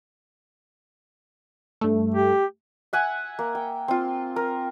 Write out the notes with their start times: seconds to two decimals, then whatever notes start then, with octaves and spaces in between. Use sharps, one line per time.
1.81 G2 A3
2.14 G4
2.93 E5 F#5 G#5
3.39 A#3
3.55 G5
3.88 C4 F4
4.36 A#4